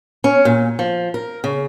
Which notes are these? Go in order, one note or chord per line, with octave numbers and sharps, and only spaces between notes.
C#4
A#2
F3
A#4
C#3